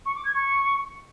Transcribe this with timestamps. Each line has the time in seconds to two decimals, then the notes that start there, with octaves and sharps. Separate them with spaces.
0.05 C#6
0.15 D6
0.25 G#6
0.34 C#6